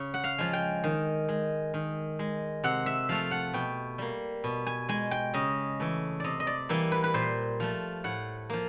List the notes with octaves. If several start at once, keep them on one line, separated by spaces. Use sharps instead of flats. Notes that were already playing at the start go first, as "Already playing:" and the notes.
Already playing: C#3
F#5
F5
F3 G#3
G5
D#3
G#3
D#3
G#3
C3 F#5
E5
F3 A3 F5
F#5
B2 G5
G3 A#3
B2
G#5
G#3 G#5
G5
C#3 D#5
E3 A3
C3 D5 D#5
D#5
D5
E3 G3 A#3
B4
B4
A#2 C5
F3 A3
A2 F#5
F3 A#3